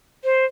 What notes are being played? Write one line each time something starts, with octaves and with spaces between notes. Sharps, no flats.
C5